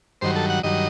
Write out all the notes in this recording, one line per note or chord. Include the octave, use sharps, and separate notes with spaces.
G2 D#3 F#3 C5
A4
F#5
G2 D#3 F#3 D#5